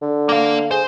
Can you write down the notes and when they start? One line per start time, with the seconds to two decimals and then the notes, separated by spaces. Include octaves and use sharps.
0.02 D3
0.29 A#3 F5
0.71 G#4 C5